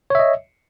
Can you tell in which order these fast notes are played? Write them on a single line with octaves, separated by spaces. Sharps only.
C#5 E5 D#5